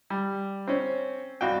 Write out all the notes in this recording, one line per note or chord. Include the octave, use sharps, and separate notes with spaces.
G3
C4 C#4
C2 F#4 F5 G5